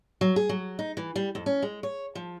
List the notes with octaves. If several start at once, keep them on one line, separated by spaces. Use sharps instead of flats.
F#3
G#4
F#3
D#4
E3
G3
F2
C#4
G#3
C#5
F3